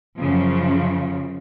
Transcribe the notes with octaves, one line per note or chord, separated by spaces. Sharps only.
F#2 C#3 F3